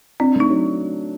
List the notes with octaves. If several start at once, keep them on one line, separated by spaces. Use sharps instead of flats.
C4 D4
A3 D#4
F#3